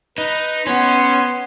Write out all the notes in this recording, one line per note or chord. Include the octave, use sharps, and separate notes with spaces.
D#4 B4
B3 C#4 C6